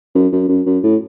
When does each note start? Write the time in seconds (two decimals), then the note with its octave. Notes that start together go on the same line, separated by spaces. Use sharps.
0.15 F#2
0.32 F#2
0.49 F#2
0.66 F#2
0.84 A2